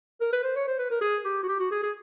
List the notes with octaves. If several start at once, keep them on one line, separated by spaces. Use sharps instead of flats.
A#4
B4
C5
C#5
C5
B4
A#4
G#4
G4
F#4
G4
F#4
G#4
G#4